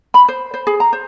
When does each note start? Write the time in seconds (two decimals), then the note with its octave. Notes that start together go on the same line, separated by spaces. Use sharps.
0.14 B5
0.28 C5
0.54 C5
0.67 G#4
0.80 A#5
0.93 C5